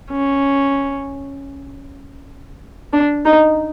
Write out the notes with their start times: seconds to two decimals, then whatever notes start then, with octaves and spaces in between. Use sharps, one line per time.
0.11 C#4
2.93 D4
3.25 D#4